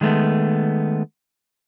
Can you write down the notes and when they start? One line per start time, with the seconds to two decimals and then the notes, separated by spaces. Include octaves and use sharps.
0.01 D#3 G#3 A3 B3